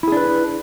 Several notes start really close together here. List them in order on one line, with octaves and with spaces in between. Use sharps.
E4 G#4 D4 B4